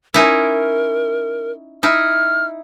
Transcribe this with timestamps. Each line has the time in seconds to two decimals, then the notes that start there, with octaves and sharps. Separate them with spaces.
0.14 C#4 D#4 E4 A#4
1.83 D#4 E4 F6